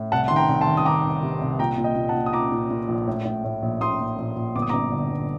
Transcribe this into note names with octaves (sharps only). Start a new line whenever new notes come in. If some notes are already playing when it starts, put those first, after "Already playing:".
Already playing: A2
C2 F#5 A5
D#3 C6
G5 A#5
C2
A5 C6
D#3
D#6
D#3 A#5 D6
C2
C3
C2
A#2 G5 A#5
A#2
D#5 G5
A#2
F#5 A5
A#2
D#6
A#2 A#5 D6
A#2
A#2
A#1
A2
A2
A2
A#1
A#1 C6 D#6
A#1
A#1
A#1
G1 D6
D#6
G1 A#5 D6
D3
G1